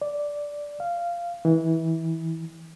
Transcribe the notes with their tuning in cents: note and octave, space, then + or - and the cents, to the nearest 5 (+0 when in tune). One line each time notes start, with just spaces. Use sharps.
D5 -5
F5 -10
E3 -20